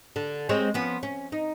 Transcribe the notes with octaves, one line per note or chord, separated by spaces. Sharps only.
D3
G#3 C4 C#5
F3 B3 C#4
C#4
D#4